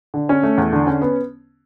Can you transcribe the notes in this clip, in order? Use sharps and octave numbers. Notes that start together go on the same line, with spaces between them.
D3
C#4
A3
E2
D3
C#4
B3